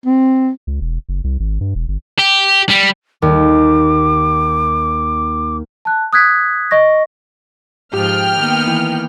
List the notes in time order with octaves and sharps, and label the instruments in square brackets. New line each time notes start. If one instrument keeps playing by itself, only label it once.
[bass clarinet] C4
[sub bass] C#2
E1
F#1
C2
G#1
G2
E1
G1
[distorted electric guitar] G4
G3
[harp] D#2 [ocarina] D6
[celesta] A5 F#6
D#6 F#6 G#6 B6
D#5 C#6 A#6
[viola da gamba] G#2 F3 [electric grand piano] G4 [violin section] G5 F6
[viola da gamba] D#3 A#3 B3
[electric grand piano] E3